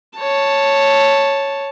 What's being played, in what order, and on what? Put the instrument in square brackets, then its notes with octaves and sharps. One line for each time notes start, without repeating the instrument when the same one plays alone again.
[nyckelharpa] C#5 A5